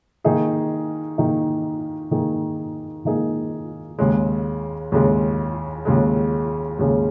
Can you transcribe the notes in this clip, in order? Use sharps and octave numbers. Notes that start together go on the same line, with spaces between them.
D#3 A#3 D#4 G#4
D#3 A#3 D#4 G#4
D#3 A#3 D#4 G#4
D#3 A#3 D#4 G#4
D#2 C#3 G#3
D#2 C#3 G#3
D#2 C#3 G#3
D#2 C#3 G#3